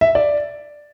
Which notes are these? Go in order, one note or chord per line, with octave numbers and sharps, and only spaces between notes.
E5
D5